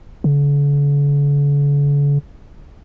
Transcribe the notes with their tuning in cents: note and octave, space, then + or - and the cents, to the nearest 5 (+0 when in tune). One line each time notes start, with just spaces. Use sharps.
D3 -45